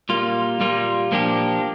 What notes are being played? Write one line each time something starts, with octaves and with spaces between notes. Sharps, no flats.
A#2 G3 A#3 F4
A#2 G3 A#3 F4
A#2 F3 A#3 D4 G4